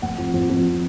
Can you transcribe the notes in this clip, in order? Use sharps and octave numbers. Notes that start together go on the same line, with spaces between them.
F1 F#5
F2
F2
F2